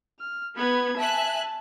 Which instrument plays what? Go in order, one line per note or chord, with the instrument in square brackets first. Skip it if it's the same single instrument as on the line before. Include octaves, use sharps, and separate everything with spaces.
[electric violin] F6
[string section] B3 [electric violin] B5 G#6
[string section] E5 G#5 F#6 [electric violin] A5